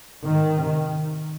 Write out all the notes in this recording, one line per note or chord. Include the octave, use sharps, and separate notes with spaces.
G#2 D#3
C3